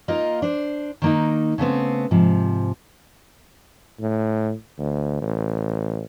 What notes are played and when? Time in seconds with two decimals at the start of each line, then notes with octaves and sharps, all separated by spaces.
0.08 A#3 D#4 F4 A#4 D#5
0.42 D4 C5
1.02 D#3 A#3 D#4
1.58 C#3 A3 B3 C4
2.11 G#2 C3 F3
4.00 A2
4.78 D2
5.22 A1